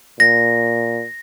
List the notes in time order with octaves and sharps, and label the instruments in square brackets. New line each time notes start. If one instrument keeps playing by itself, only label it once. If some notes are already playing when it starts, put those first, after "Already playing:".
[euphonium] A#2 [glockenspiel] A#6